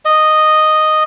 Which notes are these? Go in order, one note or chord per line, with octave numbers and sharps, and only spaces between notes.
D#5